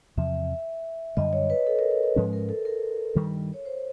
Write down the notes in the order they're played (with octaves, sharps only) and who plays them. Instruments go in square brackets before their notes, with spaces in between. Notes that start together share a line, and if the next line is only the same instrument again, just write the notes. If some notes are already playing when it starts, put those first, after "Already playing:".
[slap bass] E2 C3 F3 [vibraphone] E5
[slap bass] F#2 D3 G3 [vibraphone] D#5
[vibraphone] C#5
B4
A4
A#4
B4
B4
[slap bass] G#2 F3 G#3 C#4
[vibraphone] A#4
A4
A#4
[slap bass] G2 D#3 G3
[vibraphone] C#5
C5